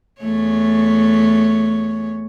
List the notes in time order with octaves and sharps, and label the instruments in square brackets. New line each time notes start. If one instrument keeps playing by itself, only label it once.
[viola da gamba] E2 A3 C#5